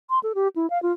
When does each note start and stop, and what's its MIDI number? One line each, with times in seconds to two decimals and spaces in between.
0.10 0.19 84
0.23 0.33 69
0.35 0.48 67
0.56 0.69 64
0.70 0.81 77
0.83 0.92 65